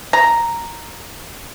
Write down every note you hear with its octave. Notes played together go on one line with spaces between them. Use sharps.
A#5